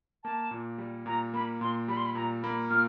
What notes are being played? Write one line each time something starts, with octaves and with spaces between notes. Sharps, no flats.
A#3 A5
A#2
G3
A#2 A#5
A#3 B5
A#2 C6
G3 B5
C6
B5
A#2 A#5
A#3 B5
A#2 F6